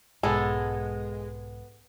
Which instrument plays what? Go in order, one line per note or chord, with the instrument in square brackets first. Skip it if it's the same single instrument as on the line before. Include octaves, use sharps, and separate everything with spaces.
[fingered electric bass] B1 G#2 [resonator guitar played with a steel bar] G#3 [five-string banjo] B3 A4